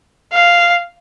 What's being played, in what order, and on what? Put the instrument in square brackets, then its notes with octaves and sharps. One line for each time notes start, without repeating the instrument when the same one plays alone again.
[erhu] F5